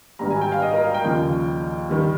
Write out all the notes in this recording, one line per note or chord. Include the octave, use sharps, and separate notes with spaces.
G#1 G2 G3 A#5
G#5
G5
F5
D#5
A#4
F5
G5
D#2 C#3 F3 G5
D#3 G3